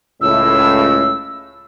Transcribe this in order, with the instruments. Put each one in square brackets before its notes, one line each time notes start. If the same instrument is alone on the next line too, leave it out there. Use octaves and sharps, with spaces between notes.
[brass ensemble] C#2 A2 [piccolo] E6